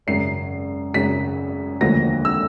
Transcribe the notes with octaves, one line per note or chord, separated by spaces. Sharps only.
G#1 F#2 C#3 C7
G#1 F#2 C#3 B6
E1 D2 D3 F3 A#3 A#6
E6